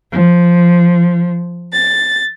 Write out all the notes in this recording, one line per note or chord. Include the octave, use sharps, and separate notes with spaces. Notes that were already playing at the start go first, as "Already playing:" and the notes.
F3
A6